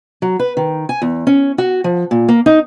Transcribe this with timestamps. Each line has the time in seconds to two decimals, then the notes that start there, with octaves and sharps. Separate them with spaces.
0.22 F#3
0.39 B4
0.57 D#3
0.89 G#5
1.02 E2
1.27 C#4
1.58 F#4
1.84 F3
2.11 A#2
2.29 A#3
2.46 D#4